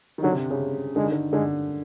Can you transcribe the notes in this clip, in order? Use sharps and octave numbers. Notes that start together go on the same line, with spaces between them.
D#3
D3 F#3
C3
C#3
D3 G#3
D#3
D3
D3 G#3